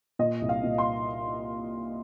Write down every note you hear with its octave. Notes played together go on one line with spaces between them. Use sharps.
A#2 D#5
C2
F5
A#2
C6